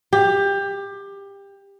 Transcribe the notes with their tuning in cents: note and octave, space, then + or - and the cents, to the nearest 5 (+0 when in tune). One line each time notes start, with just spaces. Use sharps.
G4 +20